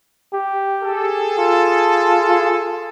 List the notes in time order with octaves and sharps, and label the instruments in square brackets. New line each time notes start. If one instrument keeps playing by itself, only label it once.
[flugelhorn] G4
[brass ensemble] G#4 A4
[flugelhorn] F4